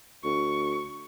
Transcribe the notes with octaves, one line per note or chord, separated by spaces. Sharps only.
D2 C#6